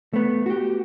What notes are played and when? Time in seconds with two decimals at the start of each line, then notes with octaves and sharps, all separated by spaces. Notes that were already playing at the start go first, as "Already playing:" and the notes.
0.13 A3 B3
0.46 F#4 G4